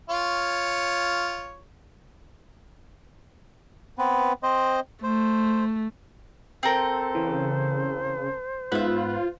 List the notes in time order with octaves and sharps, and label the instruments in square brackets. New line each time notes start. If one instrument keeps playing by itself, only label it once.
[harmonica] F4 C#5
[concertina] B3 C4 B4
C4 C5 D#5
[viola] A3 [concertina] C5
[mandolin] C4 A4 A#4 [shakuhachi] C5
[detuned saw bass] C#3 [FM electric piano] E3
[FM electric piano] G#2 B3 F#6 [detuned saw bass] F4 [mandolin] E5 B5